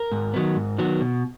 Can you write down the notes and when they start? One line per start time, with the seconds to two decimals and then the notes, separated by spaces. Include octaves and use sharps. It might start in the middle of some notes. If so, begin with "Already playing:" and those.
Already playing: A#4
0.12 G#2
0.34 D#3 F#3 B3
0.56 G#2
0.78 D#3 F#3 B3
1.01 B2